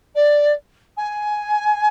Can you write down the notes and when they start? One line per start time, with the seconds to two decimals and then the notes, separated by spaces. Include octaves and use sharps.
0.15 D5
0.97 G#5